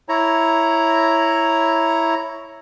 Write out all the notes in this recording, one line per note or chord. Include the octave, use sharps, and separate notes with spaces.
E4 C#5 A#5